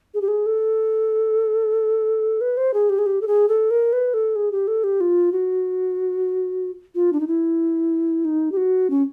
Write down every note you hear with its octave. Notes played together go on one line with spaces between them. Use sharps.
G#4
G4
G#4
A4
B4
C5
G#4
G4
G#4
G4
A4
G#4
A4
A#4
B4
A4
G#4
G4
A4
G4
F4
F#4
F4
D4
D#4
E4
D#4
G4
F#4
C#4